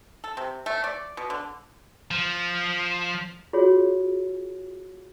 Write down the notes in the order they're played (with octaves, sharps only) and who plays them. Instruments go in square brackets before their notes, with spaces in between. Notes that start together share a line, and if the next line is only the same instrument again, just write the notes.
[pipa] A4
C3
A3
D5
B2
D3
[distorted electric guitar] F3
[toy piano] F4 F#4 G#4 C#5